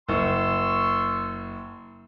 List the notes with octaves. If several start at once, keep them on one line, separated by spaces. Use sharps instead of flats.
F#1 C6 C#6 E6